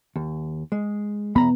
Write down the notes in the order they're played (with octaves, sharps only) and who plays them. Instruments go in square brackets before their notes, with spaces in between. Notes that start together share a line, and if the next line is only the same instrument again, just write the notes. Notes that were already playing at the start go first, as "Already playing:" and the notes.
[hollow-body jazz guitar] D#2
G#3
[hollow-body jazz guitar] E2 A#5 B5 [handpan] B3